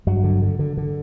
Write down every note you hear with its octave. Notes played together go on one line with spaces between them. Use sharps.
G2 F#3
D3
D3
D3
D3